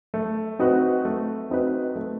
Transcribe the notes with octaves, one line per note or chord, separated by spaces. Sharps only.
A3
C4 D#4 F#4 B4
A3
C4 D#4 F#4 B4
A3